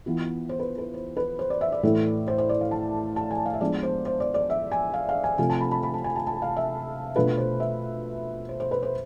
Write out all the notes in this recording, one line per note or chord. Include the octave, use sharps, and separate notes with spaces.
E3 B3 F4
C5
B4
B4
C5
B4
C5
D5
E5
D5
A2 E3 A3 E4
C5
C5
D5
F5
A5
A5
G#5
F5
E5
F3 G#3 B3 D4 F4 D5
C5
C5
D5
D5
E5
G#5
F5
F5
G#5
C3 F3 A3 C4 F4 G#5
A5
B5
B5
B5
A5
G#5
A5
A5
F5
E5
B2 A3 D4 F4 B4
C5
E5
C5
C5
B4
C5